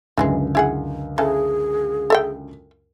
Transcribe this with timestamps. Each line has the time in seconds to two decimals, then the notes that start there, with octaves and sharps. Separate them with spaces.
0.18 C#2 F#2 D3 E3 G3 G#3
0.55 E4 G#4 F#5
1.18 C#3 E3 G#4 A4
2.10 A4 E5 G5